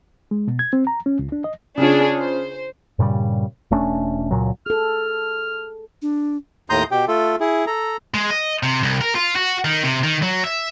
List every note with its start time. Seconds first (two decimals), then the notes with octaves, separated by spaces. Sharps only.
0.31 G#3
0.48 B2
0.59 G#6
0.73 C4
0.87 A#5
1.06 C#4
1.19 C#2
1.32 D4
1.44 D#5
1.77 C#3 D4 F4 G#4 C#5
2.18 C5
2.99 G2 A#2 C#3 G3
3.71 E1 A3 C#4 D4
4.31 C#2 A#2 F#3
4.66 G#4 A4 F6
6.02 D4
6.70 D#2 A2 A#5 C6 D#6 G6
6.91 B2 G4 G5
7.08 A3 F4 A4
7.40 E4 G#4
7.67 A4 A#5
8.14 G#3
8.31 D#5
8.63 C3
8.83 C2
9.01 A#4
9.15 F4
9.36 F#4
9.65 D#3
9.84 C3
10.04 D#3
10.22 F#3
10.44 E5